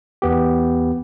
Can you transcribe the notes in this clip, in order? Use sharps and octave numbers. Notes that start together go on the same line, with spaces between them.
E2 B3 G4